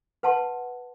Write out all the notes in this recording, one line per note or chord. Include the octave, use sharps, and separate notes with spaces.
B4 F#5 A5 C6